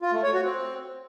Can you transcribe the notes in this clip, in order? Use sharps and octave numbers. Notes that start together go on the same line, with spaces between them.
F4
A3
C#5
F#4
C4